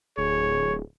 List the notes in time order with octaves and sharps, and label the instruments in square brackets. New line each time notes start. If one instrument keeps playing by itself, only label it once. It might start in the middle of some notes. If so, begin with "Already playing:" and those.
[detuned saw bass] D1 [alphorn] G#4 [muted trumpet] C#5